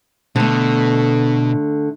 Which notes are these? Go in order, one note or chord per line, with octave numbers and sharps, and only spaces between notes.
B2 D3 A3